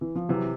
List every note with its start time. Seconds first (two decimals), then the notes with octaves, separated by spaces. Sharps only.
0.01 E3
0.15 F3
0.29 C3 E3 F#3